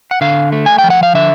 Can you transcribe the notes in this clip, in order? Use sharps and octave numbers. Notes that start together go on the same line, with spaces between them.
F#5
D3 F5
A3
G#5
G5
F3
F#5
F5
D3 E5